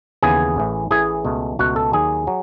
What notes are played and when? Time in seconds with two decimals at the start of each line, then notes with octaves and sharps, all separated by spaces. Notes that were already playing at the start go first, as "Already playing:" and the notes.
0.23 D#2 C#3 E3 B3 G#4 G#5
0.56 A1 A2 E3
0.91 A1 A2 E3 G#4 G#5
1.25 C#2 B2 A3
1.59 C#2 B2 A3 F#4 F#5
1.76 A4 A5
1.93 D#2 D#3 F#3 G#4 G#5
2.27 F#3